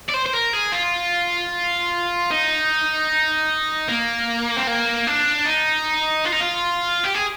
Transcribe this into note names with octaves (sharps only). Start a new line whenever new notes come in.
D5
C5
C5
A#4
G#4
F4
D#4
A#3
C4
A#3
D4
D#4
F4
D#4
F4
G4
G#4